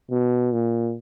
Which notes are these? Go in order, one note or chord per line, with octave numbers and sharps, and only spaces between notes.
B2
A#2